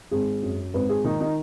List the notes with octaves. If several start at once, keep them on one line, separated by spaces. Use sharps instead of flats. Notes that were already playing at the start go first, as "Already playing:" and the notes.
G#1 G#4
F#2
G#1 B4
G#4
D#3 D#4
D#4